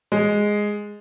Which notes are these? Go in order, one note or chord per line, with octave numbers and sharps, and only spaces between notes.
G#3